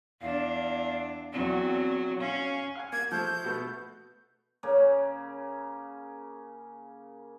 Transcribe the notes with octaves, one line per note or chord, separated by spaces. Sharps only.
E2 D4 F5
E2 F#3 C4
C#4 F5
F5 F#5 G#5
A#3 G#6
F3 A3 G6
B2 A3 B3
C#3 A#3 C#4